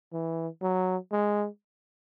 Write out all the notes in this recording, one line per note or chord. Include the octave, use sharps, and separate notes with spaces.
E3
F#3
G#3